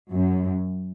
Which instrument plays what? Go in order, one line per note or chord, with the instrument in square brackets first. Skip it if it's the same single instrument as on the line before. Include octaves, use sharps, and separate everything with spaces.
[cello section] F#2